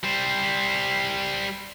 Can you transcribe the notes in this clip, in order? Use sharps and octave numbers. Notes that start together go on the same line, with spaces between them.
G3 C5